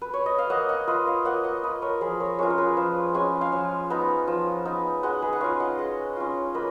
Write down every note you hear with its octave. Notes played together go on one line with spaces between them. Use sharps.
B4
C#5
D#5
F5
A#3 D#5 F#5
D#5 F#5
F4 B4 D#5
C#5 F5
A#3 D#5 F#5
D#5 F#5
F4 B4 D#5
A#4 C#5
F3 G#4 B4
A#4 C#5
G#3 C#4 F4 A#4 C#5
A#4
G#4 B4
F3
G#3 C#4 F4 G#5
F5 G#5
F3
B3 D#4
F3
B3 D#4
G#3 D#5 F#5
G#4 B4
F#5
C#4 F4 F5 G#5
D#5 F#5
G#3 D#5 F#5
C#4 F4
A#3 B4 D#5